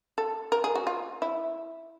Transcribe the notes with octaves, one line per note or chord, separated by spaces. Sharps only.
A4
A#4
G#4
F#4
F4
E4